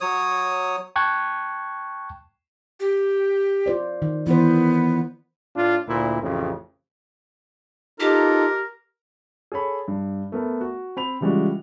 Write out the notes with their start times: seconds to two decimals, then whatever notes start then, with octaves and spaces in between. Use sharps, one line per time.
0.01 F#3 C#5 D#6
0.96 G5 A5 C#6 F#6 G#6
2.80 G4
3.66 F4 C5 D5
4.02 D#3
4.27 E3 B3 C5
5.55 A2 D4 F4
5.87 D2 A#2 E4
6.21 A1 F2 C#3
8.00 D#4 F4 G4 A4 A#4
9.52 G#4 A4 C#5 B5
9.88 G2
10.32 A3 B3 A#4
10.61 F#4
10.97 C4 B5 F7
11.21 C#3 E3 G3 G#3 F4 F#4